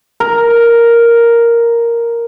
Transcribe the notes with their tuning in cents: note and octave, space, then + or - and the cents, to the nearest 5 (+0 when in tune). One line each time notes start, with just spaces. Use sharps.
A#4 +0